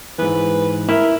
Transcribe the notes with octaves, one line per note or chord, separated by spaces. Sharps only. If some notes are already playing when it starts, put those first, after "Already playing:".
G#2 E3 B4
E4 A#4